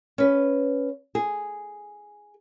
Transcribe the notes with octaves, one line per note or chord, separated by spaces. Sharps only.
C#4 B4
G#4